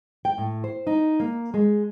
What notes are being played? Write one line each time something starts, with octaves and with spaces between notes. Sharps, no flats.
G5
A2
C5
D#4
A#3
G#3